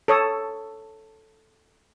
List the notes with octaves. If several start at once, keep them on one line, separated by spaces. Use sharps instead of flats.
A4 C#5 D#6